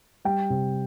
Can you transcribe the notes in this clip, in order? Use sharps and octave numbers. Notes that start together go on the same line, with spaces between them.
G3 G5
C3